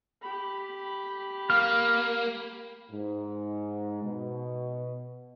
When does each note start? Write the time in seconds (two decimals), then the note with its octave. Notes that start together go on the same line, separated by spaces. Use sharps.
0.22 G4 B5
1.50 A#3 F6
2.91 G#2
4.03 B2